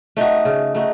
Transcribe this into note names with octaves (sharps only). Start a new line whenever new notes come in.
A3 D#4 F#4
C#3
A3 D#4 F#4